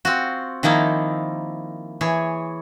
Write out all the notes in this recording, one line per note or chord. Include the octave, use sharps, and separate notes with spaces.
C4 F4 F#4
D#3 F3 A#3 D#4 E4
E3 G#4 C#5